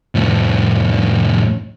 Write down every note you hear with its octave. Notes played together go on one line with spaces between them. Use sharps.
F2 A2